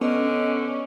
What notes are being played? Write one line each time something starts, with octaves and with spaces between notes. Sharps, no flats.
D3 B3 C#4 D#5